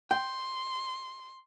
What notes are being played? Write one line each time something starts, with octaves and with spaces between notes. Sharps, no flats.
G5 C6